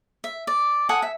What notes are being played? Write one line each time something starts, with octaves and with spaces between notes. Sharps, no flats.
E5
D5
A4 F#5 G#5 D#6
E5